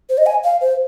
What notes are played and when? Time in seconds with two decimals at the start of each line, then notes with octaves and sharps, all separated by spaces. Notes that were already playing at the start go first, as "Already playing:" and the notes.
0.09 C5
0.18 D#5
0.26 G#5
0.44 F5
0.61 C5